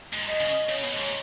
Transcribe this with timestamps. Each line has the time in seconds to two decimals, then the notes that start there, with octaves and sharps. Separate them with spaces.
0.13 G#2
0.27 D#5
0.40 C#3
0.69 C#3 C#5
0.83 B2
0.96 G#2